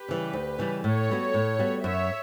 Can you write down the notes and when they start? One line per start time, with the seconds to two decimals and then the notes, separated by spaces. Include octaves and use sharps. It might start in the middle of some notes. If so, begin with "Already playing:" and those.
Already playing: G4 B4
0.08 C#3 E3 G3
0.33 D2
0.59 C#3 E3 G3
0.84 A2 A4 C#5
1.09 G3 B3 F#4
1.34 A2
1.59 G3 B3 F#4
1.83 F#2 C#5 E5